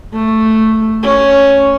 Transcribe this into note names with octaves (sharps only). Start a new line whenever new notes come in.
A3
C#4